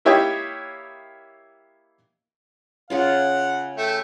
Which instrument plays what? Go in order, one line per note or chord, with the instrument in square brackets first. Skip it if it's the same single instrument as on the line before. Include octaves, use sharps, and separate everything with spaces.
[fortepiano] A#3 E4 G4 C#5 D#5 G5
[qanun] C#3 C#4 F4 [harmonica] F#5
[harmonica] A3 E5 G5